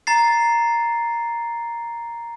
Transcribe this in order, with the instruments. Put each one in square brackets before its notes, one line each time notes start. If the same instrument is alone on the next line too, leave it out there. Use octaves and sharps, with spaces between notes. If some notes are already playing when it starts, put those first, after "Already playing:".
[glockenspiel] A#5 A6 C7